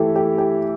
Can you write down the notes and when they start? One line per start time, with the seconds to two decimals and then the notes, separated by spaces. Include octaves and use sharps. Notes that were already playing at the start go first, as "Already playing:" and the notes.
Already playing: E3 A3 E4 G4 A4
0.16 G4
0.38 G4